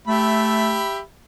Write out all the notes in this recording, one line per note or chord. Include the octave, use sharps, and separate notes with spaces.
A3 G4 E5 B5